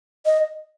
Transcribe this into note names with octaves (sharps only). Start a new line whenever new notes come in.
D#5